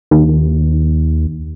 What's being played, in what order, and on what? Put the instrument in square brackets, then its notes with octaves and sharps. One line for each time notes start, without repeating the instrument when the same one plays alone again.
[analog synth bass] D#2